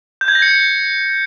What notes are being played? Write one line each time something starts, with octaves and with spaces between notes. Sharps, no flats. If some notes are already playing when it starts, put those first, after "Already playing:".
G6
G#6
A#6
C#7